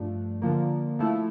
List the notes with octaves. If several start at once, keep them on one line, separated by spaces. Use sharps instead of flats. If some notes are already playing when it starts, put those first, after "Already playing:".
Already playing: G2 F3 A3 D4
D3 F3 A#3
F3 A3 E4